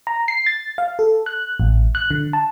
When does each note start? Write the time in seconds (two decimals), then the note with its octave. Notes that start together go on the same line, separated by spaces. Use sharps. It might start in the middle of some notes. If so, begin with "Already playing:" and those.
0.07 A#5
0.28 C7
0.46 A6
0.78 F5
0.99 A4
1.26 F#6
1.60 A1
1.95 F#6
2.11 D3
2.33 A5